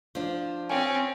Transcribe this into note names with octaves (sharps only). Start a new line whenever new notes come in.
F3 D4
C4 C#4 G5 G#5